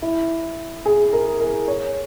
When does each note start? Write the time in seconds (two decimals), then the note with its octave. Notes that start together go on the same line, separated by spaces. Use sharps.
0.02 E4
0.85 G#4
1.13 A#4
1.40 A#4
1.68 C#5